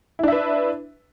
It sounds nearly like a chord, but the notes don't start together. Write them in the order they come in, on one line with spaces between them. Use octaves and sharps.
E4 D4 E5 B4